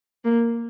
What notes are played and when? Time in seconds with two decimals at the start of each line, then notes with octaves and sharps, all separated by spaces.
0.25 A#3